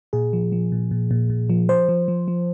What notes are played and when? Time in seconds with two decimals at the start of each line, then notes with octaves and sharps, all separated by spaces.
0.13 A#2 G#4
0.33 F3
0.52 F3
0.72 A#2
0.91 A#2
1.11 A#2
1.30 A#2
1.50 F3
1.69 F3 C5
1.89 F3
2.08 F3
2.28 F3